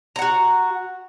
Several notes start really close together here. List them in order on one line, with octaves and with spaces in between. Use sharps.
A#5 F#5 F#4